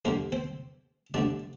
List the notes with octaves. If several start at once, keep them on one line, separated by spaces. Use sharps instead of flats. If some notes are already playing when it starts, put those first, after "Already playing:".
F2 D3 G3 A#3 A#4
C4 C5
D2 D3 G3 D4 D5